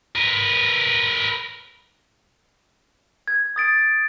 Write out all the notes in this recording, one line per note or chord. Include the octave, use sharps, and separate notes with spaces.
A#4 B4
G#6
D#6 A6 D7